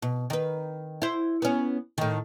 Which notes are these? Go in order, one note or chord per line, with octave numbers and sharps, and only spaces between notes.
B2
D#3 B4
E4 C5
B3 C#4
A2 D#3